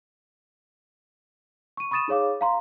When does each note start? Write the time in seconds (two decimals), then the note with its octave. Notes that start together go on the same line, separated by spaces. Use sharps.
1.77 C#6 D#7
1.91 B5 C#6 D#6 A6 D#7 E7
2.08 D#4 G#4 C#5 F5 D6
2.41 F5 A#5 C6